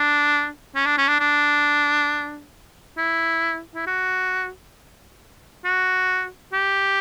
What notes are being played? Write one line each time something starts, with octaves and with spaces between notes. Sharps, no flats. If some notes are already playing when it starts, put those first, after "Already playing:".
Already playing: D4
C#4
D4
C#4
D4
D4
E4
E4
F#4
F#4
G4